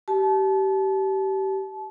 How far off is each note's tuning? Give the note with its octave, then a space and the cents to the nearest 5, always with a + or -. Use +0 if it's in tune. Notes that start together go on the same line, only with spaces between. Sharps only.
G4 -25 A5 -30